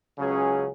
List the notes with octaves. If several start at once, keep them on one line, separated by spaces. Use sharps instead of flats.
C#2 C#3 F#3 C#4 G#4